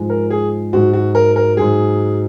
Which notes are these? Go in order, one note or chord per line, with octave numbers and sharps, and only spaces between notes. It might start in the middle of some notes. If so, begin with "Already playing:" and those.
Already playing: G#2 F3 G#3
A#4
G#4
G#2 F#3 F#4
F#4
A#4
A#4
G#2 F#3 G#4